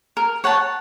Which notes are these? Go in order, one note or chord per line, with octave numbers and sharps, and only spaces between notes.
A#4
C#5 F#5 A5